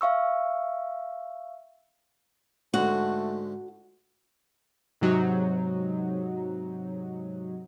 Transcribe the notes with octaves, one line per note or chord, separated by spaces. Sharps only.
E5 F5 C#6 E6
G#2 D3 A3 F#4
G#2 C3 F#3 D#4